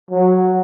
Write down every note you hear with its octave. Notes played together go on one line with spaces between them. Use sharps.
F#3